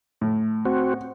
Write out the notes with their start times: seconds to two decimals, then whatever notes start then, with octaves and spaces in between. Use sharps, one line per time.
0.21 A2
0.65 C4 F#4